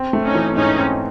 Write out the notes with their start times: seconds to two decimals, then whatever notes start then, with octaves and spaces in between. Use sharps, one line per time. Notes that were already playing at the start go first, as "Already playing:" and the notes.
Already playing: C4
0.13 A3
0.24 C#4 D#4
0.35 E3
0.56 G#2 C#4 D#4
0.78 C4